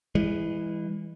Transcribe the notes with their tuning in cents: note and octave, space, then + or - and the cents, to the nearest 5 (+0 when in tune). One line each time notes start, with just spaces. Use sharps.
E3 +0 G#3 -30